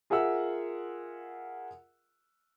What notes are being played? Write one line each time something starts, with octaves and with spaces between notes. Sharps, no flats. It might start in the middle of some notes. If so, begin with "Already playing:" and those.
F4 G#4 A#4 E5 F#5 E6